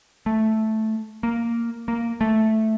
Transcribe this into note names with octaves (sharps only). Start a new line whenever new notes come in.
A3
A#3
A#3
A3